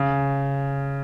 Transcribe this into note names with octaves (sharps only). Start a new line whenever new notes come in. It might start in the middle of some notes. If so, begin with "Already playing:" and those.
Already playing: C#3